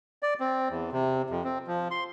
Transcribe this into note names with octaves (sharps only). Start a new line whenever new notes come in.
D5
C4
E2
C3
F2
C4
F3
C6